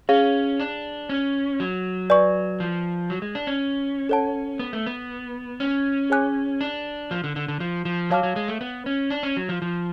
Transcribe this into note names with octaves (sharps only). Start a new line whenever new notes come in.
C#4 G#4 C#5 F5
D4
C#4
F#3
B4 D5 G#5 C#6
F3
F#3
G#3
D4
C#4
A4 C#5 F#5 A5
B3
A3
B3
C#4
G#4 C#5 G#5 D6 F#6
D4
F3
D3
D3
D3
F3
F3
F#3 C#5 F5 A5 D6 F6
F#3
G#3
A3
B3
C#4
D4
C#4
F#3
F3
F3